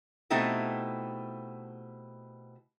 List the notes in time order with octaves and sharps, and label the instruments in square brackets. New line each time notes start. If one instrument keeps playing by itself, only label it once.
[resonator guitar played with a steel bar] B2 A3 C4 D#4 E4 G4